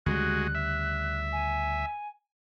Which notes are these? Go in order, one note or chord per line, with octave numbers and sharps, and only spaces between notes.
D2 C#3 G3 G#3 F#4 F#6
E5
G#5